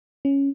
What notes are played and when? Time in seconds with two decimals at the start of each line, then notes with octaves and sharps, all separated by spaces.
0.25 C#4